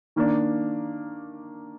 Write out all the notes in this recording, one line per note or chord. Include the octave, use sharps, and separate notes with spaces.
D#3 A#3 D4